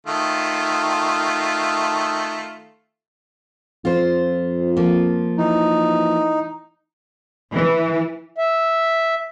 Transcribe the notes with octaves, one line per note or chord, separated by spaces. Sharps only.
D#3 A3 F4
F2 F4 C5
F3 A#3 F4
E3 D#4
E3
E5